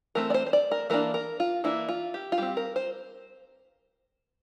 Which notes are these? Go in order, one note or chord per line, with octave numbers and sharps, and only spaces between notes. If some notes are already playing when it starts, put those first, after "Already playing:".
E3 A3 C4 A#4
D5
C5
C5
D5
A#4
E3 A#3 D4 A#4
A#4
F4
E3 A#3 D4 E4
F4
G4
F4
G3 C4 G4
A#4
C5